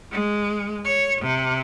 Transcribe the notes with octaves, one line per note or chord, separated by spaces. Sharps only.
G#3
C#5
C3